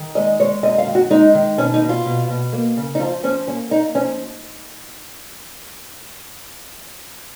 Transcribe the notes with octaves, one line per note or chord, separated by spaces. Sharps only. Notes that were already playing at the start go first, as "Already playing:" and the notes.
Already playing: D#3
G#3 D#5
G#3 C#5
F#2 D#5
F5
D#3
F#4
G#3 D#4
D#3
B2 C#4
D#4
B2
F4
B2
B2
A#3
C#3
D#4
F3 F4
F3 C#4
A#3 C#4
A#3 D#4
F3 C#4